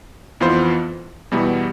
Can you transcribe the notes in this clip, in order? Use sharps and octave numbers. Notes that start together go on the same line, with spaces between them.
F2 E3 B3 F4 C5
E2 B2 G3 B3 E4